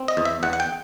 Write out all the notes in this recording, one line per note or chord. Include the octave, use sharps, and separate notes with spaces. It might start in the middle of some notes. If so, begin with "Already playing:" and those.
Already playing: C4
D#5
E2
E5
E2 F#5
F#5
G5